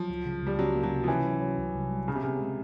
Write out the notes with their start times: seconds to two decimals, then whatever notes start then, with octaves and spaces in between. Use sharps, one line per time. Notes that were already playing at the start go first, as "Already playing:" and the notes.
Already playing: F3 F#3
0.10 C#2
0.25 C#3
0.42 C#2 G3
0.59 F#3 C#4
0.75 A#3
0.83 F#3
0.92 C3
1.04 F3
1.08 E3 C#4
1.25 F#3
1.41 F#3
1.58 C2
1.74 C2
1.91 G3
2.08 C#3 B3
2.15 C3
2.23 C#3 B3
2.41 G#3